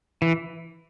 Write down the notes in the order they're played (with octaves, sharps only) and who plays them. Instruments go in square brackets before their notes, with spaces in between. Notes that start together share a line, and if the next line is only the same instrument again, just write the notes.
[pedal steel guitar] E3